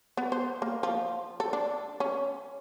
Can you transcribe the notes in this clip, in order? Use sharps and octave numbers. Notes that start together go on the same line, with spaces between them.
B3
C5
A#3
F3
A4
D4
C#4